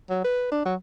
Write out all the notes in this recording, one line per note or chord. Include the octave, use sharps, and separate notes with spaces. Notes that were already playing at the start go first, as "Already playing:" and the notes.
F#3
B4
D4
F#3